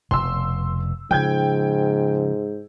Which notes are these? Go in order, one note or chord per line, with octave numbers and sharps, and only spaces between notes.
F1 B2 C6 E6
G#2 C#3 F3 G5 G6 G#6